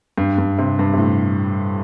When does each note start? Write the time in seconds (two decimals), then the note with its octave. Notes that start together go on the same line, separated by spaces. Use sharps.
0.18 G2
0.38 G2
0.58 C3
0.79 G2
0.93 C3
0.98 A2